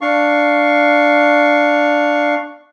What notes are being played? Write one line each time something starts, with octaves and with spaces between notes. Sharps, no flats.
D4 F5 C#6